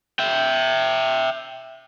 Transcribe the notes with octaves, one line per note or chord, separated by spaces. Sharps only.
E5 G5